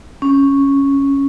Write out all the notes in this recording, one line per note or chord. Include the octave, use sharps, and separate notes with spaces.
C#4